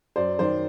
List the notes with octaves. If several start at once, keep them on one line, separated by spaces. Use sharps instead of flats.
F#2 C5 D5
D#3 C5 D5